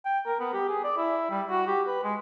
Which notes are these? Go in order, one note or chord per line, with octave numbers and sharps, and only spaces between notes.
G5
A#4
B3
G4
G#4
D5
E4
G3
F#4
G4
B4
G#3